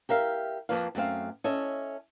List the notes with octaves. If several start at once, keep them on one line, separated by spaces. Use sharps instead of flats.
G4 A#4 E5 F5
F2 G#2 F3 A#3 B4 F5
F#2 A3 C4 F5
C#4 A4 D#5 E5